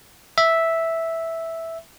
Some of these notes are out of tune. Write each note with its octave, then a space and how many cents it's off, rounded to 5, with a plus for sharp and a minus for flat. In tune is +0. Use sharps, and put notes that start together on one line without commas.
E5 -5